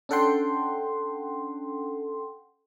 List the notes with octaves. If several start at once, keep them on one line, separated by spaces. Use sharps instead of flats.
C#4 D4 A4 F#5 G5 C6